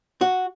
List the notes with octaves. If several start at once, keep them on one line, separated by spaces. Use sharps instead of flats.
F#4